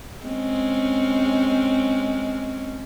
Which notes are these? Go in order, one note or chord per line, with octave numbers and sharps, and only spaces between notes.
G#3 C4 C#4